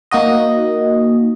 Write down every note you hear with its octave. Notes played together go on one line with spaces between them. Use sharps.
A#3 D#4 F#4 D#5